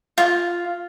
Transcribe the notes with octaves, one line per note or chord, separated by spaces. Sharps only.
F4